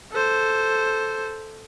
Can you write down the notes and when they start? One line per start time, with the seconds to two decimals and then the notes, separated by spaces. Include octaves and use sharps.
0.12 A4 C5